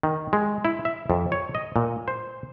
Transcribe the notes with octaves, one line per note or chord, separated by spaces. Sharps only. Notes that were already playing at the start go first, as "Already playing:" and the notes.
D#3
G#3
E4
E5
F2
C#5
D#5
A#2
C5